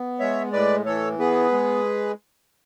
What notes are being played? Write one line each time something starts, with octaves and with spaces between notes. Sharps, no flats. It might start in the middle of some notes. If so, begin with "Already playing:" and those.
Already playing: B3
G#3 C#5 E5
A2 B4 D5
E3 A4 C#5
B3 G#4 B4
G#3